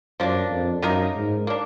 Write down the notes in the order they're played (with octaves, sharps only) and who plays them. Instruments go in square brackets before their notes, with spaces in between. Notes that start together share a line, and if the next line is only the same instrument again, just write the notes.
[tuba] F#2 [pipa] F3 A#3 D4
[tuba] F2
[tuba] F#2 [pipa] D#3 A#3 D#4 A#4
[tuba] G#2
[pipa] A#3 D4